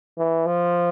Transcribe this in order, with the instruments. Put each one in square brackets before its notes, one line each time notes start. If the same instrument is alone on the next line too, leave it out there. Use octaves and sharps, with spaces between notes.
[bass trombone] E3
F3